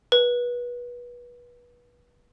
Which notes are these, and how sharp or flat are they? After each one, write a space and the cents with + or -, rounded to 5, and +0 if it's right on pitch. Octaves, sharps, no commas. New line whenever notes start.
B4 -25